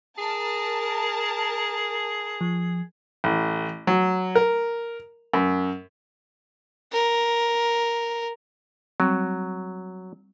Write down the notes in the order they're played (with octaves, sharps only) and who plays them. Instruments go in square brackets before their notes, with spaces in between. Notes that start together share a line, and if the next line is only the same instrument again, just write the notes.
[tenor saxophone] G#4 [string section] A#4 A5
[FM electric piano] F3
[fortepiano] A1
F#3
A#4
F#2
[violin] A#4
[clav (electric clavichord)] F#3 [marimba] G3 C4